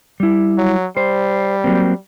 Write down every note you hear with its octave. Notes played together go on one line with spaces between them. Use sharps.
G3 E4
F#3
G3 C5
F#3 A#3 C4